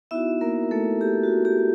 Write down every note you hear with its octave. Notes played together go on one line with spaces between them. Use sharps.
B3 D#4 E4 F#4 E5
A#3 A#4
A3 A4
G4
F#4
G4